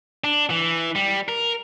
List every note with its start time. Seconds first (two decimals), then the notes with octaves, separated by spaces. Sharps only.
0.24 D4
0.50 E3
0.96 G3
1.29 A#4